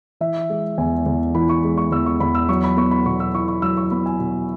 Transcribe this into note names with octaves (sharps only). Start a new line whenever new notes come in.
E3 E5
G#3
E2 G#5
E2
E3 B5
C#6
G#3
C#6
E2 E6
C#6
E2 B5
E6
F#3 C#6
B5
B3 C#6
B5
B2 C#6
E6
E4 C#6
C#6
F#3 E6
C#6
B3 B5
G#5
B2